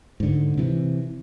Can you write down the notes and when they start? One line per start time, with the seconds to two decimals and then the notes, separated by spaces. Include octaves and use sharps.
0.20 G#2 D3
0.57 C3 E3